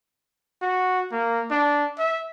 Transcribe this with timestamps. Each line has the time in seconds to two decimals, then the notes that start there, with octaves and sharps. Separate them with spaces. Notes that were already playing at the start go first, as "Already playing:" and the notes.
0.62 F#4
1.12 A#3
1.50 D4
1.98 E5